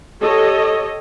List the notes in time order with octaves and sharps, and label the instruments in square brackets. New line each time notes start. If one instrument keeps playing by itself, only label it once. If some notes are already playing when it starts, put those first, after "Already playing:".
[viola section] G4 A4 C#5 D#5